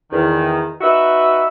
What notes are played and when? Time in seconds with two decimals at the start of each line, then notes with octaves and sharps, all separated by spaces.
0.12 E2 D#3
0.80 D#4 F#4 B4 E5